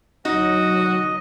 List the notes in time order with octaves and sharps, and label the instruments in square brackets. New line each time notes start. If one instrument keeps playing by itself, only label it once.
[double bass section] D2 B2 F#3 [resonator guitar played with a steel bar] D#4 [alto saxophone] F#4 [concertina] D#5